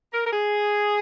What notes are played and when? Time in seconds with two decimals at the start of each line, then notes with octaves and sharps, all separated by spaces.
0.12 A#4
0.25 A#4
0.32 G#4